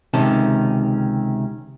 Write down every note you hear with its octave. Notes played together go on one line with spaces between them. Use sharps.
C#2 C3 D#3 C#4 A5